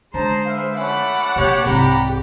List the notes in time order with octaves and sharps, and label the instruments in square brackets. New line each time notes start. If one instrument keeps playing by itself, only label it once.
[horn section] F#2 A5 A#5 [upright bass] D3 [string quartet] G#3 C5
[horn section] B4 E5 F5
[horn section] F3 A3 C#4 [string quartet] F#5 A5 D6 [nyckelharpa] B5
[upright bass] B2 A#3 [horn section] G4 [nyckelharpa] C#5
[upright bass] C2 G#2 [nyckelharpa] G4 [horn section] A#5 B5